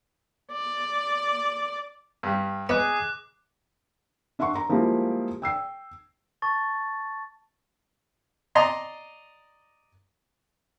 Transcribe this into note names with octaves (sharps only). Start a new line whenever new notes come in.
D5
G2 G3
B3 G#4 D#5 B5 D6 F#6
D4 E5 F#5 C6 C#6
A#5
F3 G3 G#3 A#3 E4 F4
G5 E6 C7
A5 C#6 A6
D5 D#5 A#5 C6 D#6